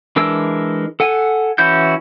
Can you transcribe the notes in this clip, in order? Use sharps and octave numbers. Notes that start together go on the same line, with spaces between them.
E3 G#3 D4 A#4 E6
A4 F#5 G#5
E3 C#4 E4 F#4 G6